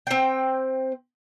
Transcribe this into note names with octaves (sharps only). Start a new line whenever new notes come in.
C4 G5